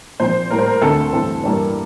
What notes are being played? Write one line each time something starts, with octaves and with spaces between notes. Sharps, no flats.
A#2 F3 C4 C5
A2 G3 A#3 A#4
C5
A#4
D2 D3 A3 C4 A4
G2 E3 A3 C4
G2 E3 G3 A#3